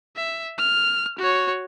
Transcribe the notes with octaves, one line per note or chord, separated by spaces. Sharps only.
E5
F6
F#4 C#5